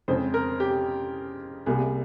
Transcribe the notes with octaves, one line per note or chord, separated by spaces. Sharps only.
F2 C#3 G#3 C4 C5
A#4
G4
C2 C3 G3 A#3 G#4